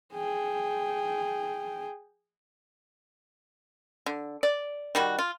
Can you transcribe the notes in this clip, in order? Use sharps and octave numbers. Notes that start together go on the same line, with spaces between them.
G#4 G5
D3
D5
D#3 G3 F#4
F4